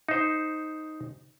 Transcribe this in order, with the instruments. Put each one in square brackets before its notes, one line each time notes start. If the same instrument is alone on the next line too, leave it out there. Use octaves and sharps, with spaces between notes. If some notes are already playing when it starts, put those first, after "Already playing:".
[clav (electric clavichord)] D#4 C5